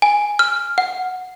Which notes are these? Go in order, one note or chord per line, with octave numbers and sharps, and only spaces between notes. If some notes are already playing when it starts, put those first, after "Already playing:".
G#5
F6
F#5